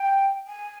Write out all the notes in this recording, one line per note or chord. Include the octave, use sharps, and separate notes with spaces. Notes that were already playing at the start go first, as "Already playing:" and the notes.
Already playing: G5
G#5